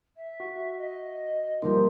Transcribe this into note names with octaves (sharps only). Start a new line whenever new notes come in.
E5
F#4
D#5
F3 G3 A#3 D#4 G4 A#4 C6